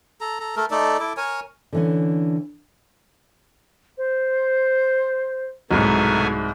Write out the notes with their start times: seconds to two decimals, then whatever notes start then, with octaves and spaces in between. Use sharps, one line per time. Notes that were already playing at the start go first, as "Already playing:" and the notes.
0.21 A4 A#5
0.40 A4 A#5
0.56 A3 A4 A#4
0.71 A3 D#4 A4 D5
0.99 E4 A4 D6
1.17 A#4 C#5 G#5
1.73 D3 E3 C#4
3.98 C5
5.71 C2 G#2 B2 F#3 A3 G#5 A#5